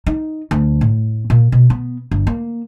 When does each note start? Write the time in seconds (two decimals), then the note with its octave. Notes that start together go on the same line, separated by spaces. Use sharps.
0.07 D#4
0.51 D2
0.81 A2
1.30 A#2
1.52 B2
1.70 B3
2.11 G1
2.27 A#3